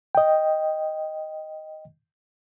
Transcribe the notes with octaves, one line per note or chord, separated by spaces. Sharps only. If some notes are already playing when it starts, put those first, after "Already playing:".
D#5 G5